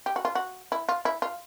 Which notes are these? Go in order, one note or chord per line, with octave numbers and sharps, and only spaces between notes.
G4
F#4
F4
F#4
E4
F4
E4
F4